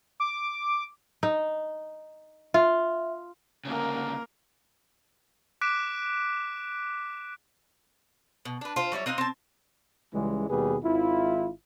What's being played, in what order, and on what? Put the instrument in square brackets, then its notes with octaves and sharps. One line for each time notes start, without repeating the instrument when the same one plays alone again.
[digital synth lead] D6
[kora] D#4
[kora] F4 [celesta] E5
[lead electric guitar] D2 C#3 [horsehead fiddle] A#3 A#4
[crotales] D6 F#6 B6 D7 E7
[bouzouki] B2
D4 B4
F4 C5
F#3 G3 E4 C#5
C4 D#4 F4 F#5
C4 A5
[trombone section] C#2 C#3 E3 G3 G#3
D#2 B2 G3 A#3 G#4 B4
G#1 E4 F4